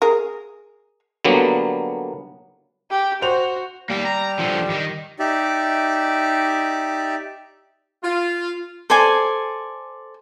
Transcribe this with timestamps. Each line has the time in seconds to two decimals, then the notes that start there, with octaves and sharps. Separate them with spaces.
0.02 G#4 A#4
1.25 D3 F#3 G3 A#3 B3
2.90 G4
3.22 F#4 C5 F7
3.90 G3 A#3 G5
4.05 A#5
4.39 D3 F3
4.70 D#3 D#4
5.19 D#4 G4 D5 E5
8.04 F4
8.90 A4 C5 D5 G#5